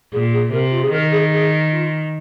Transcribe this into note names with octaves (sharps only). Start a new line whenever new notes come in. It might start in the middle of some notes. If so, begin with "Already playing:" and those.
A#2 G#4
G#4
C3 A#4
F4
G#4
D#3 A#4
G#4
G#4
F4